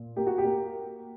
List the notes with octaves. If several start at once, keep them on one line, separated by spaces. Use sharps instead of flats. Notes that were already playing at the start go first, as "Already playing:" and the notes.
Already playing: A#2
A#3 G4
F#4
G4
A#3